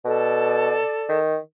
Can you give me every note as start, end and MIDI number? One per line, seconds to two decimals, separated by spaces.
0.05 0.78 47
0.05 1.18 69
0.05 1.18 74
1.09 1.37 51